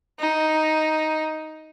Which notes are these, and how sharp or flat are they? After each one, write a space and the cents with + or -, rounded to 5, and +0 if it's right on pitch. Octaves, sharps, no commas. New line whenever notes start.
D#4 +5